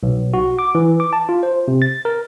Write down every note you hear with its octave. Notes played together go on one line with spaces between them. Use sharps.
B1
F#4
D6
E3
D6
A5
F4
C5
C3
A6
A#4